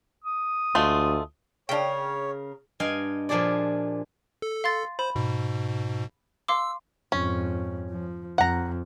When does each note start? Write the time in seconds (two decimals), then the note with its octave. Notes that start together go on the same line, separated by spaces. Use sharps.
0.24 D#6
0.75 D2 G#3 A3 F4
1.69 C#3 D4 A#4 C#5 G5
2.80 G2 D#5 F5 G5 G#5
3.29 A#2 F3 D4 G4 G#4 D5
4.42 A4
4.64 F5 C6 A6
4.99 C5 B5
5.16 G#2 B2
6.48 F5 C6 D6 E6
7.12 F2 G#2 C#4
7.90 F3
8.38 F2 F#5 A#5